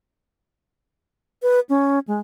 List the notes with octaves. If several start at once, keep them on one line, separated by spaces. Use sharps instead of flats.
B4
C#4
G#3